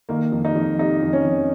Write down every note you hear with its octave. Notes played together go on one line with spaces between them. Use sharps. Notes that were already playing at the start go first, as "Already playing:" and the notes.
D#3 A#3
F2
D#4
F2
C3 D#4
F2
C#4
F2